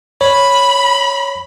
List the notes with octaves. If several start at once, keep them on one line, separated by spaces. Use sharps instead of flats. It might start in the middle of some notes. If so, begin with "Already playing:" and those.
C#5 B5